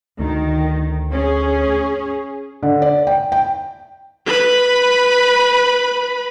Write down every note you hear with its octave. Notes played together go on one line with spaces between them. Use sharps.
D2 D#3
C#4 G#4
D3
D5
G5
G5
B4 B5